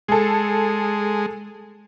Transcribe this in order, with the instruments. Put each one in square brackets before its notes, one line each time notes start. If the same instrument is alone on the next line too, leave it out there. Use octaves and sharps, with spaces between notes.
[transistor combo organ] G#3 [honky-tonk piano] G#4 A4